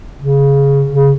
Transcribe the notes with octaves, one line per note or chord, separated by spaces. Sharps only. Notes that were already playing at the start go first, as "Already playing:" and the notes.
C#3
C#3